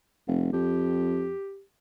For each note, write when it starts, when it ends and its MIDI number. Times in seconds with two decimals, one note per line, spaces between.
0.27 0.50 29
0.53 1.32 41
0.53 1.62 67